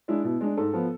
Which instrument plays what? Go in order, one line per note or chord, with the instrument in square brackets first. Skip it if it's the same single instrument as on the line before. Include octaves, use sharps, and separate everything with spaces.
[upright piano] G#3 D4 E4
B2 E4
G#3 D4
G#2 A4
F3 B3